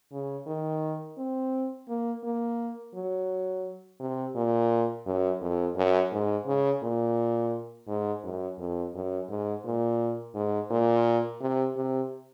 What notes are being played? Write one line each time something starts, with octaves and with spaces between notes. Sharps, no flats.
C#3
D#3
C4
A#3
A#3
F#3
C3
A#2
F#2
F2
F#2
G#2
C#3
A#2
G#2
F#2
F2
F#2
G#2
A#2
G#2
A#2
C3
C3